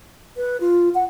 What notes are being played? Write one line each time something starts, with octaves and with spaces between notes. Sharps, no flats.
B4
F4
F#5